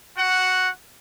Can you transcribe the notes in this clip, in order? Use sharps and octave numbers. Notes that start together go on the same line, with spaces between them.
F#4 F#5